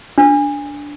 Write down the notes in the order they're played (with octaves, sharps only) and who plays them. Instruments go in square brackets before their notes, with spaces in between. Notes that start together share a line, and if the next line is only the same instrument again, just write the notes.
[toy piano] D4